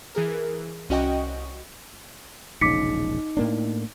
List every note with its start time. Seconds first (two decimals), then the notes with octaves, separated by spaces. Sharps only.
0.15 E3 G#4 A#4
0.89 C2 C#4 F#4 D#5 G5 C#6
2.61 E1 A#1 C#3 D#4 D6 B6 C#7
3.37 A2 A#3 D4